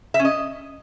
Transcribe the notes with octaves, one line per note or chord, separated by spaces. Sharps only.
E5
C#4
D#5